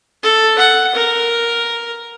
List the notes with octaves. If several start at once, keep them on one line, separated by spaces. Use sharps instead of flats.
A4
F#5
A#4